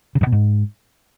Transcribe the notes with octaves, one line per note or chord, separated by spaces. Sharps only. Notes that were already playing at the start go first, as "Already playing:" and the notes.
C#3
G2
B2
G#2